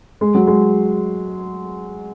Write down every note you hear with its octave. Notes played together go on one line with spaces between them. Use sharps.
G#3
F#3
G#3